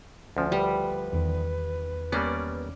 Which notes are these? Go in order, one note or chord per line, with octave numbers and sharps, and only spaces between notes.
D2 F3 C#4
G3 B4
E2 D#3
G3 A#3 B3 C#4 D5